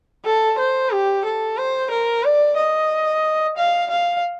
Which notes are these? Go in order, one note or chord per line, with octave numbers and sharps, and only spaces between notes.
A4
C5
G4
A4
C5
A#4
D5
D#5
F5
F5